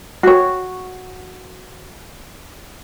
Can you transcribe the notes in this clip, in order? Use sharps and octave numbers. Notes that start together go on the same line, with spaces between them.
F#4 C#5